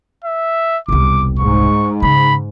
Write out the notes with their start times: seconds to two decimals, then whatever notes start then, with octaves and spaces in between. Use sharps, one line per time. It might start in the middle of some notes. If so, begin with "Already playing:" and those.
0.24 E5
0.88 E1 C2 D6
1.39 G#2 C#6
2.02 C#3 B5